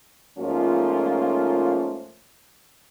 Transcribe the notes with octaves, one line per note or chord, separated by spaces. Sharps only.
G#2 F3 A3 A#3 C#4 F4